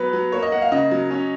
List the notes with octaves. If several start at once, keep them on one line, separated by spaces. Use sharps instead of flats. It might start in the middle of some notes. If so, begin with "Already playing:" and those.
Already playing: F#3 B3 B4
F#3
A#3 C#5
D#5
A#3 F#5
F5
C#3 D#5
F#3
C#4